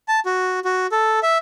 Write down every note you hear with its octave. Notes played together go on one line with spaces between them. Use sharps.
A5
F#4
F#4
A4
E5